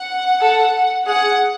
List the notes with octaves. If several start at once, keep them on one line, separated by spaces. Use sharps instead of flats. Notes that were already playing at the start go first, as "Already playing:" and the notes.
Already playing: F#5
A4
G#4 F#5